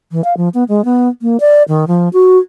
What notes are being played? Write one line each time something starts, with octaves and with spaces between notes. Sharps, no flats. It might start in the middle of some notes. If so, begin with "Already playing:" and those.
E3
F5
F3
B3
G#3
B3
A#3
D5
D#3
F3
F#4